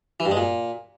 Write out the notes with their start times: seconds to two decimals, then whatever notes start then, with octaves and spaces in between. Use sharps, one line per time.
0.20 E3
0.26 G2
0.31 G#3
0.37 A#2